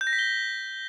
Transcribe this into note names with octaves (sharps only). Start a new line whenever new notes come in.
G6
A#6
B6
G7